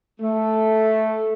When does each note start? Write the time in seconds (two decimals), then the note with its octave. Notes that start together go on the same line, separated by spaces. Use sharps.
0.21 A3